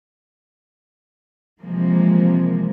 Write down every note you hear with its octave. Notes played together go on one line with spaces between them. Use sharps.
C3 E3 F3 G#3 A#3